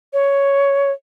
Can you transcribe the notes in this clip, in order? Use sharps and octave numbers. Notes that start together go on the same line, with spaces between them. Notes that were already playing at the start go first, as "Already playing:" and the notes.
C#5